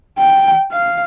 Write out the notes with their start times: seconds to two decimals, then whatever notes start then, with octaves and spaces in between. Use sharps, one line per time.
0.18 G5
0.72 F5